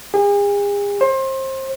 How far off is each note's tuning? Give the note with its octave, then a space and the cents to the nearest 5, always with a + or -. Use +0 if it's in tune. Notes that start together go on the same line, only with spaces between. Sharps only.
G#4 -40
C5 +30